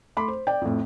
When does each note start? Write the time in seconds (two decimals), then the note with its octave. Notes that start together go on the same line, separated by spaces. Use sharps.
0.17 A3 B5 C6 D6
0.28 C5
0.47 D5 G5
0.61 F2 A2